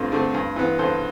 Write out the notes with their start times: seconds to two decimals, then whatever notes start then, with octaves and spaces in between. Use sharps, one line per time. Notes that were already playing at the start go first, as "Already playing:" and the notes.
Already playing: G2 D3 A3 C4 F4
0.12 D3 A3 C4
0.34 G2
0.56 E3 B3
0.79 G2 A4 C5